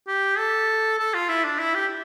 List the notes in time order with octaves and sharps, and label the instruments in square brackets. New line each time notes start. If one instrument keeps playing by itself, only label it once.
[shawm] G4
A4
A4
F4
E4
D4
E4
G4